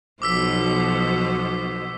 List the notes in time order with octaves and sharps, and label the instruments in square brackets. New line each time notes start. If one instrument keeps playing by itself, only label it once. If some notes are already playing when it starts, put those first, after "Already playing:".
[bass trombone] B1 [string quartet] B2 C5 [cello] F3 [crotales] D6 E6 B6